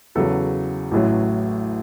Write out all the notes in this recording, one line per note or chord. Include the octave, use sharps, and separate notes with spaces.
E2 C#3 F#3 A4
A1 A2 F#3